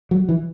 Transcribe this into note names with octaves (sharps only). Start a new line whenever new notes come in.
F#3
E3